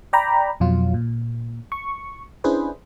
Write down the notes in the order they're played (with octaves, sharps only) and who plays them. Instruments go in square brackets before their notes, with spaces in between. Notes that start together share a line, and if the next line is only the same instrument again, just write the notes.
[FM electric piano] D5 G5 A#5 B5
F2 B2 F#3 F4
A#2
C#6
C#4 D4 E4 G#4 B4 C5